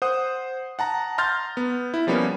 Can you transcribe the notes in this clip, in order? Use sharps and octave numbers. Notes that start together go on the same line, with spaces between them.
C5 F#5 D#6
F#5 A5 A#5
A#5 C6 F6 G6 A6
B3
E4
F3 G3 A#3 B3 C#4